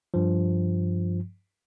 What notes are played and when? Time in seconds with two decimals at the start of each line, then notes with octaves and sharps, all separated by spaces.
0.14 G2 F3